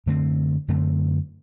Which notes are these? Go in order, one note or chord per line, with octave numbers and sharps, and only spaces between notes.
F#2 D3 A3 C4
F#2 D3 A3 C4